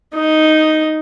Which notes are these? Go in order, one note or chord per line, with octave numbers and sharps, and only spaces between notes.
D#4